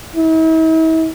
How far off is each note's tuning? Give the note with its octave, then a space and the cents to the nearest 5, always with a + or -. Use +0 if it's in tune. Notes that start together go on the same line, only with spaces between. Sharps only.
E4 -45